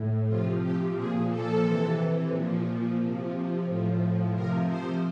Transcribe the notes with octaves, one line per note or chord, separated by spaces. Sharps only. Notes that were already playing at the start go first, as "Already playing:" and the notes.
Already playing: A2
C3 F3 F4
G4
A#2 F3 G#4
A4
C3 E3
A#2 F3
C3 F3
A2 F3
C3 F3 A#4
C5